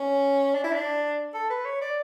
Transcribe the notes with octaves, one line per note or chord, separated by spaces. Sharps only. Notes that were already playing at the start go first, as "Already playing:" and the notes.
Already playing: C#4
D4
E4
D4
A4
B4
C#5
D5